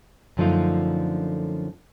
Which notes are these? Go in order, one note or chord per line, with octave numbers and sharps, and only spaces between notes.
F#2 D3 F3 A3 D#4 F4